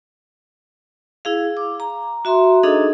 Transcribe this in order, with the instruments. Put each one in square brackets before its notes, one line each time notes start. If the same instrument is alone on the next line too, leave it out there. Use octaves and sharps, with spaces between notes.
[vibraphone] E4 G#4 F5
D6
A#5
F#4 E5 A#5 C6
D4 D#4 G#4 A4 D#5